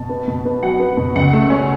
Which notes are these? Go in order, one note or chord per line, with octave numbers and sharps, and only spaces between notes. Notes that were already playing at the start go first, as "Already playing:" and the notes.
Already playing: B2 A5
B3
B2
B3
F#3 F#5
B3
B2
C#2 F#5
A3
C#4